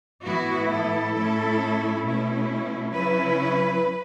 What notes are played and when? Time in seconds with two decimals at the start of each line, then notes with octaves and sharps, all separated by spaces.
0.25 A2 E3 B3 E4 F#4
0.70 A4
1.14 A2 A3 C#4 E4
2.04 B2 A3 C#4 E4
2.93 C#3 F#3 C#4 E4 B4